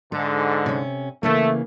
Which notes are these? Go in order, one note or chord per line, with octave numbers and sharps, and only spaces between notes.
G#2 D3 A4
C3 C#4
C#3 E3 A3 A#3